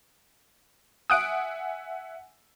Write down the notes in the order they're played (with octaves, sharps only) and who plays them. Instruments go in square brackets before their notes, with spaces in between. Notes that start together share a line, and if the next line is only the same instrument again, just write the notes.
[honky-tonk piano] E5 F#5 G#5 [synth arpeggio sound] D#6 F#6 D7